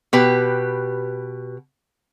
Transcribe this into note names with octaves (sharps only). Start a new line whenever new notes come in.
B2 G4 B4